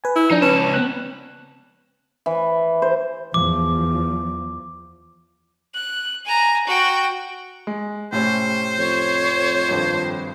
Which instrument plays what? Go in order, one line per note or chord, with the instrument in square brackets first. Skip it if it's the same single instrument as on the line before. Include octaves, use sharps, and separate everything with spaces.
[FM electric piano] B4 G#5
[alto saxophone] E4
[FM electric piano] F3 D4 [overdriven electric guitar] D#4
[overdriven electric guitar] C#2 A5 [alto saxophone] C#4 [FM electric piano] B4
[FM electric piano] B3 C4 F#6
[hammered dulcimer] E3
C5
[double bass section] E2 F3 [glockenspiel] D6
[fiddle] F#6
G#5 A#5
F#4 G5
[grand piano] G#3
[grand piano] A2 C3 C#4 [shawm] C5
[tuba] F2 [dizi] C#5
[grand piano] G#1 G2